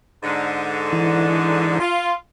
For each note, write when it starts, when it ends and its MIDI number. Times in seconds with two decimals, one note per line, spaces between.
0.23 1.75 44
0.23 1.75 50
0.93 1.79 52
1.80 2.12 65